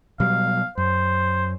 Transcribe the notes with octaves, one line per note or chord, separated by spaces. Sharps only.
B2 F#3 G3 F5
F#2 C5